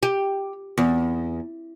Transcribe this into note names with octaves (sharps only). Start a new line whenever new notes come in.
G4
E2